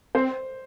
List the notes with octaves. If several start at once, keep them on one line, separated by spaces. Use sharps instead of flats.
C4 C5